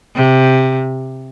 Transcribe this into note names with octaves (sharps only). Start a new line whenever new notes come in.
C3